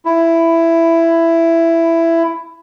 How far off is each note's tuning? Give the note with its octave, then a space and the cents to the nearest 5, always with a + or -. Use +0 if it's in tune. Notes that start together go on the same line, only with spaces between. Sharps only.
E4 +10